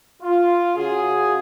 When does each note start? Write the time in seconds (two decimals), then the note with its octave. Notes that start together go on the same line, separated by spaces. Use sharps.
0.23 F4
0.77 C#3 F#4 G#4